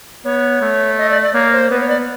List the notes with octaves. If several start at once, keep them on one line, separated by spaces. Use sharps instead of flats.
B3 C#5
A3
D#5
D5
D5
A#3 C#5
C5
B3 B4
C#5
D5